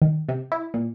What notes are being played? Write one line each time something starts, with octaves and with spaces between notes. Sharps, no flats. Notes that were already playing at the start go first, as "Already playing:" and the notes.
D#3
C3
E4
A#2